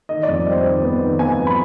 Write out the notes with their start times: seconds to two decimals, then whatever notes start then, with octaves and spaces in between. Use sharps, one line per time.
0.09 D#3 D#5
0.23 D5
0.28 F2
0.46 G3 C5
0.64 D#3
0.83 B3
1.01 D#3
1.19 B3 G#5
1.38 F2
1.47 B5